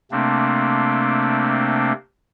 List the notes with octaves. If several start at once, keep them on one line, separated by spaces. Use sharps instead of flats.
C3 A3 A#3 C4 D4